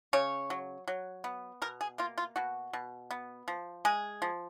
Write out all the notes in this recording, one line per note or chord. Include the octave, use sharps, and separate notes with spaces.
C#3 C#5
F#3
F#3
B3
B2 A#4
G#4
A#3 F4
F4
B2 F#4
B2
B3
F3
G#3 G#4
F3